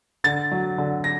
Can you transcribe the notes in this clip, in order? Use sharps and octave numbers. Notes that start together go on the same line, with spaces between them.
D3 A6
F#3
D3
A#6